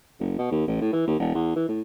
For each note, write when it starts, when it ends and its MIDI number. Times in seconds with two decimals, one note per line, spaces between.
0.20 0.35 30
0.38 0.51 47
0.51 0.64 39
0.67 0.78 33
0.81 0.93 45
0.93 1.03 52
1.07 1.15 39
1.20 1.34 28
1.34 1.56 40
1.56 1.65 52
1.69 1.81 45